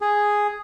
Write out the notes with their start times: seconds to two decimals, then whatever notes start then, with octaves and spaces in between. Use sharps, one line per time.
0.01 G#4